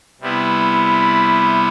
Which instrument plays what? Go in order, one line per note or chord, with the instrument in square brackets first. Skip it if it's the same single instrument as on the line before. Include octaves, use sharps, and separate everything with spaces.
[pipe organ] C3 G3 B3 E4